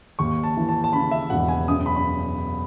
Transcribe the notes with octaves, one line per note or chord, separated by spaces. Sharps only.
D#2 C#6
A5
E3
A5
A5
C#3 B5
E5
E1 F#5
G#5
F#2 D#6
B5
B5